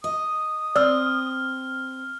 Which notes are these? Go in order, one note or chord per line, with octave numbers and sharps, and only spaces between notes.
D#5 D#6
C4 D5 E6 F6